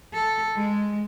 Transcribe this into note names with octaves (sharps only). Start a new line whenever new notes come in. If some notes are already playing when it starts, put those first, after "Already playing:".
A4
G#3